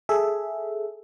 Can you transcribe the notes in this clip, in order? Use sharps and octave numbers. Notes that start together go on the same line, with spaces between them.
G#4 A4 E5